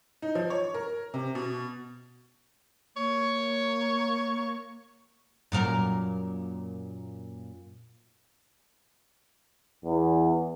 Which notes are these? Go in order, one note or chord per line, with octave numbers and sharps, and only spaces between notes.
D#4
F3
C#5
A#4
C3
B2
A#3 C#5
F#2 A#2 A#4
E2